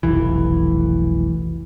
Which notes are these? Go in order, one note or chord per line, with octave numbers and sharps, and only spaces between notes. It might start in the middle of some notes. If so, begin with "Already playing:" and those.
F1 B1 E3